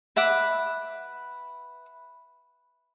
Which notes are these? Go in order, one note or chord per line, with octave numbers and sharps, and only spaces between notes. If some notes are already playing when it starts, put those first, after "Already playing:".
B4 E5 F#5 D6